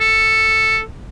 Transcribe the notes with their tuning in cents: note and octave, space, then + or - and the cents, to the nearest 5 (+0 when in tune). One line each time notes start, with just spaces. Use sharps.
A4 +5